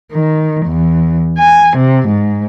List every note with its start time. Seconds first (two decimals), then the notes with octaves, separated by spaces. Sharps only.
0.11 D#3
0.66 E2
1.38 G#5
1.77 C3
2.07 G#2